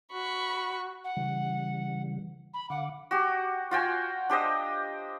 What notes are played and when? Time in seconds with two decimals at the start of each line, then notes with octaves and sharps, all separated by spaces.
0.13 F#4 B5 C#6
1.04 F#5
1.17 C#3 E3 G3
2.54 B5
2.70 D3 F5 F#5 D6
3.11 F#4 G4
3.71 F4 F#4 G5 G#5
4.29 D4 G4 C5 D#5